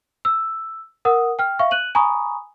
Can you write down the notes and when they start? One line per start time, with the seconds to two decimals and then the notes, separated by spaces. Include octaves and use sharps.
0.25 E6
1.05 A#4 F#5 D#6
1.39 G5 F6
1.59 E5 F5 C#6
1.71 F#6 D#7 F#7
1.95 G#5 A#5 B5 C#6 D#6